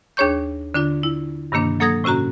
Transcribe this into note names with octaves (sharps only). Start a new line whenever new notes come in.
D#2 D4 G#4 C#5 C#6 G6
D3 D4 F4
E4
G2 C3 D#3 A#3 D4
F#3 A#3 A4 D#6 G#6 A#6
A2 C3 C#4 F#4 A#5